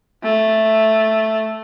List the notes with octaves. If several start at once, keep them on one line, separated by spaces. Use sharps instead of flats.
A3